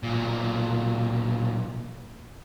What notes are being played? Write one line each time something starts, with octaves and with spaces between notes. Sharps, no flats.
B1 A#2